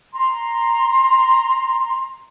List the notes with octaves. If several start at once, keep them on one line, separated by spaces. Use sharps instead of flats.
A#5 C6